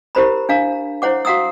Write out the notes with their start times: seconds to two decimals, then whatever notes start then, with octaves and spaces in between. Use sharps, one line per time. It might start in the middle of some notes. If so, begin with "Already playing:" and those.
0.15 E4 G4 A#4 C5 A#5 B5
0.49 D4 F5 A#5
1.02 E4 C5 C#5 F#5 D6
1.25 F#4 F5 F#5 A#5 D#6 E6